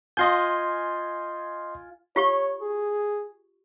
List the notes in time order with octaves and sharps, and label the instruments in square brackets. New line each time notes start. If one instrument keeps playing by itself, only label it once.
[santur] F4 G#5 [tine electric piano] D#5 C6 G6
[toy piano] F4 G4 C#6 [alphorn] C#5
[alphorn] G#4